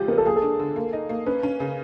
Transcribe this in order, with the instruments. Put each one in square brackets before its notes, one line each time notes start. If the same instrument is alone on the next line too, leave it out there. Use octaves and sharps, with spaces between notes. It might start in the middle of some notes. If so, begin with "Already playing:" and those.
Already playing: [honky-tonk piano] C#3 F3 G#3 [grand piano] F4 G4
[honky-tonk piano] B3 [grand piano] A#4
[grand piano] A4
[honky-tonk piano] A#3 [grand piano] G#4
[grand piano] A4
[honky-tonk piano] D4
D3
A#3
D#4
A#3
[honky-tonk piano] C#4 [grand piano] B4
[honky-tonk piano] C#4
C#3